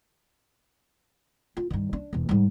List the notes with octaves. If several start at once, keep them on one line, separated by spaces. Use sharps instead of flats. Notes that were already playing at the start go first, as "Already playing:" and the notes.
F4
G2 D#3
D4
E1 E3
G#2 G3